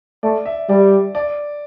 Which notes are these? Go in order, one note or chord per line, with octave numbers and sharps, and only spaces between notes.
A3 D5
E5
G3 D5
D5